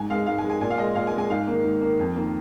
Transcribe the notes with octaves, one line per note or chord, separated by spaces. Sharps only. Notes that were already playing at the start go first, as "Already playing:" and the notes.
Already playing: G#2 G#5
G#3 F5
G#2 F5
G#5
G#3
G#5
A#2 G#5
F5
G#3 D#5
A#2 F5
G#5
G#3
G#5
G#2 F5
D#3 A#3
G#2
D#3 A#3
F2
D#3 A#3